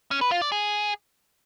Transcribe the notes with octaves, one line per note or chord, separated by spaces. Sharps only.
C#4
B4
F4
D5
G#4